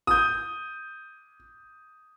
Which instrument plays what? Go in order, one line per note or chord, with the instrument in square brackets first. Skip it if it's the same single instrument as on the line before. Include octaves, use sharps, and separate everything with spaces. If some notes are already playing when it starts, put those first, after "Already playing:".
[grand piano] D#6 G6